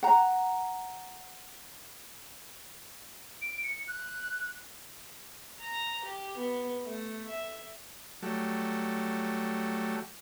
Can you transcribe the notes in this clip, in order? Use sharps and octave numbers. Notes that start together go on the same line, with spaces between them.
F#5 A#5
D7
C#7
F#6
A#5
G4
B3
A3
E5
F#3 G3 A3